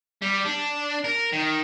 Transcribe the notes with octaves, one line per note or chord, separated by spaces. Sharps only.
G3
D4
A#4
D#3